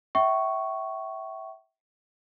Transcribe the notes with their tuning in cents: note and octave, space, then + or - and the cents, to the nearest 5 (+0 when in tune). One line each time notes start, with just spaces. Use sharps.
E5 -10 G5 -45 C#6 +0